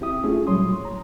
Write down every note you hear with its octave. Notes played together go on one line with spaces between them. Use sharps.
C4 E4 G4 E5 D#6
A3 C#4 E4 F4 G#4
A#2 F#3 G3 C#5 C6 D#6
A#5